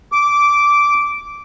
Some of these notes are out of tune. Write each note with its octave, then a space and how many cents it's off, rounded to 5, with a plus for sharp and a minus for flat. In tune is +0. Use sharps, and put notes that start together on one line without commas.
D6 -10